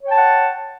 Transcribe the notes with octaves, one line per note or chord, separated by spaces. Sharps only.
C#5 F#5 G5 A5